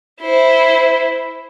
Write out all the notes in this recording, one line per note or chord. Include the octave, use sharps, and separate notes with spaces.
E4 C5